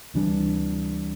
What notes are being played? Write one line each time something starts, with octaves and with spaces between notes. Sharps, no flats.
D2 C3 E3 G3 D4